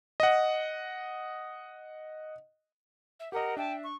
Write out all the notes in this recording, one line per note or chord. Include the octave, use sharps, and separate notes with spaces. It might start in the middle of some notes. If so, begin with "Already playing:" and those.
D#5 F#5
E5
G4 A#4 D#5 F#5
D4 E5 G5 A5
C#6